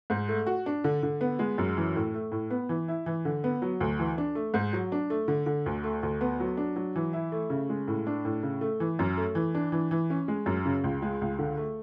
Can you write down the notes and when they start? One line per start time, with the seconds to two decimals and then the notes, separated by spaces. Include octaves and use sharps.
0.10 G#2
0.29 A3
0.47 F#4
0.66 D4
0.84 D3
1.03 D3
1.21 B3
1.39 G#3
1.58 F#2
1.77 E3
1.96 A2
2.14 A3
2.32 A2
2.50 B3
2.69 E3
2.88 E4
3.06 E3
3.25 D3
3.44 B3
3.62 F#3
3.81 D2
3.99 E3
4.18 D4
4.35 A3
4.54 G#2
4.73 F#3
4.92 D4
5.10 A3
5.28 D3
5.46 D3
5.66 D2
5.84 A3
6.03 D2
6.21 B3
6.40 F#3
6.57 D4
6.76 F#3
6.96 E3
7.13 E4
7.32 A3
7.50 C#3
7.69 G#3
7.88 A2
8.07 D4
8.25 A2
8.43 C#3
8.61 A3
8.80 E3
8.99 F#2
9.17 A3
9.35 E3
9.55 D4
9.72 E3
9.91 E3
10.10 C#4
10.28 G#3
10.46 F#2
10.65 C#3
10.84 C#2
11.02 G#3
11.21 C#2
11.39 D3
11.57 A3